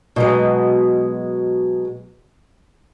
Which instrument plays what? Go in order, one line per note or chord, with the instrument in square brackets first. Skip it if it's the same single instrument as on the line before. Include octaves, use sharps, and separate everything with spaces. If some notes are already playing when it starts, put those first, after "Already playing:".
[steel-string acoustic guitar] B2 F#3 G#3